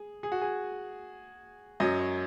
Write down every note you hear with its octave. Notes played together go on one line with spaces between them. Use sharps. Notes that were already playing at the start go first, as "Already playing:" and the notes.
Already playing: G#4
G#4
F#4
G#4
F#2 F#3 D#5
C#5